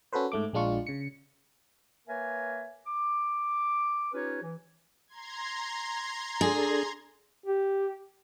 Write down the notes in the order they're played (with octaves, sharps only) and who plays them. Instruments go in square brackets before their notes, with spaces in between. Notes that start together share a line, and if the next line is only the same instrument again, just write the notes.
[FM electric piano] C#4 F#4 A4 B4 C5
G#2 A3 D6
A#1 G#3 D4 F4 C#6
C#3 C#7
[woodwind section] A#3 A#4 B4 C#5 E5 G#5
D6
C#4 D#4 F4 G4 B4 C#5
E3
[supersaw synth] A#5 C6 G#6
[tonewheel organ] D4 A4 [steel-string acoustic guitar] G#4
[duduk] G4